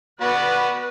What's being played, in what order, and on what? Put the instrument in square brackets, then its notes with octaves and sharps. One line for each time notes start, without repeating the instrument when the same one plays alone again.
[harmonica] B3 F#4 D5 [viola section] B4